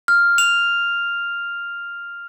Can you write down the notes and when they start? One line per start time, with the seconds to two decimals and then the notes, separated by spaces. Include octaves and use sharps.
0.08 F6
0.38 F7